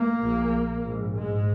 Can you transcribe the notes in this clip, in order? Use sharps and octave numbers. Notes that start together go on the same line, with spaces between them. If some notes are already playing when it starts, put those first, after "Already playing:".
Already playing: A#3
A#1 A#2
A#1 G#2
G#2 G#3